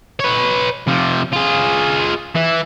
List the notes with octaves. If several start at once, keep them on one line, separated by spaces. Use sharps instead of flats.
B4 C#5
C3 F3
F4 G#4
E3 E4